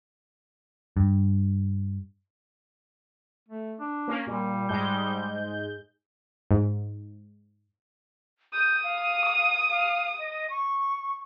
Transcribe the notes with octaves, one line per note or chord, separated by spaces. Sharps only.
G2
A3
D4
A#3 C#4
A#2 G3
G#2 G#3 G6
G#2
D#6 G6
F5
F5
D#5
C#6